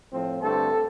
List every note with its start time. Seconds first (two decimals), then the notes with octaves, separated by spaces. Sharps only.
0.11 A2 F3 C4
0.41 G2 D3 A3 C4 A4